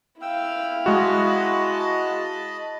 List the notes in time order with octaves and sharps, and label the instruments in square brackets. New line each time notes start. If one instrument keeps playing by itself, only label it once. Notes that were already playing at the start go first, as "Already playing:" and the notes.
[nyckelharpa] E4 F5 [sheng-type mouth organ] G5 E6
[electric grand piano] G#3 F#4 [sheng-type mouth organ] D#5 A5 B5